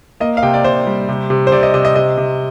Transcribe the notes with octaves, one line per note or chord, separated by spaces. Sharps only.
A#3 D#5
F5
C3 G5
D5
C3 C5
G3
C3
C3
C5
C3 D5
D#5
C3 D#5
D#5
C3 D#5
C3